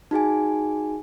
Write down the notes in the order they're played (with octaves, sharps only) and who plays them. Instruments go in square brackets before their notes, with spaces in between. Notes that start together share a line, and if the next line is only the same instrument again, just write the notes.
[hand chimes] D#4 F#4 G#4 G#5